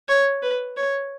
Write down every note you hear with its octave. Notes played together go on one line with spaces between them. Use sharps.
C#5
B4
C#5